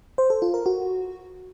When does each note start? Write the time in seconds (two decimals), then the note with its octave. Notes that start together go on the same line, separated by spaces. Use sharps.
0.18 C5
0.30 A4
0.42 F4
0.54 A#4
0.66 F#4